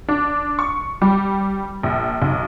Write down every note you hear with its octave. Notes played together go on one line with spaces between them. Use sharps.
D4
C#6
G3
A#1
B1